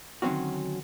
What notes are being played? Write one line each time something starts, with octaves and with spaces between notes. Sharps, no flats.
D3 D#3 F#3 C4 C#4 F#4